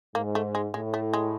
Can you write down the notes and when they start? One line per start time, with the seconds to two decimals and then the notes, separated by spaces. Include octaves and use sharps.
0.15 G#2 A#3
0.35 A3
0.55 G#3
0.74 A2 G#3
0.94 A3
1.13 G#3